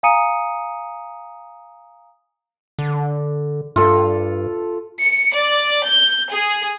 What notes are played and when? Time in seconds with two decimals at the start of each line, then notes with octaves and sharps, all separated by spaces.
0.03 F5 G#5 A#5 D#6 C#7 D#7
2.79 D3
3.76 G2 F4 A4
5.00 C#7
5.32 D5
5.84 G6
6.30 G#4